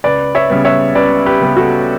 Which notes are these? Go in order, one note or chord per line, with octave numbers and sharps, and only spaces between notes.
C#2 B4 D5
C#5 E5
C#3 G3 B3
C#5 E5
C#2 B4 D5
G4 B4
C#3 G3 B3
F#4 A4